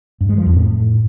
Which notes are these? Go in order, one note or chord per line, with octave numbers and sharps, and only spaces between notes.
G2
G#3
F3
F2
A2